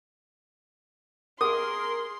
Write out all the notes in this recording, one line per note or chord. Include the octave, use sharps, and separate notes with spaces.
G#4 A#4 C6 D#6